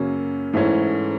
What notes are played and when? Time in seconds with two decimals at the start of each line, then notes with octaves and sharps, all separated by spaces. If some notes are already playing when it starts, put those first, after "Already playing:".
Already playing: F#2 C#3 F#3 A#3 C#4
0.54 G#2 E3 A3 C#4 E4